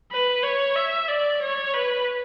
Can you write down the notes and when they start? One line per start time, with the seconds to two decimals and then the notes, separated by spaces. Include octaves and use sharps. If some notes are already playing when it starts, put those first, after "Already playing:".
0.12 B4
0.43 C#5
0.76 E5
1.09 D5
1.42 C#5
1.74 B4